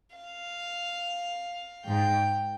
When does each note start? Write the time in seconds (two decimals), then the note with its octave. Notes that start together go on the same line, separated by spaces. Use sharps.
0.16 F5
1.86 G#2 G5